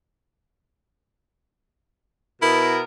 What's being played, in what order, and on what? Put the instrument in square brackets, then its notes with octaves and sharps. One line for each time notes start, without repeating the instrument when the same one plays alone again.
[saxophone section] B2 A#4 [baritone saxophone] E4